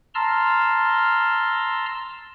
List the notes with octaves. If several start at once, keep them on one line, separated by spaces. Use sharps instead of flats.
A5 A#5 C6 E6 F6